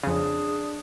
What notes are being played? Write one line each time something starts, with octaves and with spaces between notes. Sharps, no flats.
F2 C#3 D4 G#4